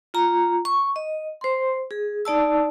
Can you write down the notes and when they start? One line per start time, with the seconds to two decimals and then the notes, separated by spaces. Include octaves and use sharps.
0.14 F4 A#5
0.65 C#6
0.96 D#5
1.41 C5 C6
1.91 G#4
2.25 D#4 D5 A5 E6